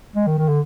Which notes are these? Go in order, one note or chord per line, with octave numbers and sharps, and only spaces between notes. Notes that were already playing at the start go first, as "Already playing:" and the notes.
G#3
D#3
D#3
D3